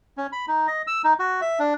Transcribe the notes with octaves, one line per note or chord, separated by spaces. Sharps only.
C#4
B5
D#4
D#5
E6
D#4
F#4
E5
D4